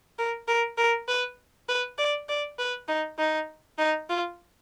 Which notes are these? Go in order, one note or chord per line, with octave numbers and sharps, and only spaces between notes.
A#4
A#4
A#4
B4
B4
D5
D5
B4
D#4
D#4
D#4
F4